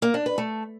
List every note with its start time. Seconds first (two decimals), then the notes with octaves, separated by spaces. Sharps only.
0.02 A#3
0.14 D4
0.26 B4
0.38 A3